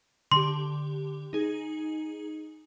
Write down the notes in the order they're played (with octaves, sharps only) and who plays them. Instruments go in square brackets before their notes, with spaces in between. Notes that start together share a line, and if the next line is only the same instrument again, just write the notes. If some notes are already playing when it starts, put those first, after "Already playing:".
[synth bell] D3 G4 [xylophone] C6
[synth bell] D#4 G#4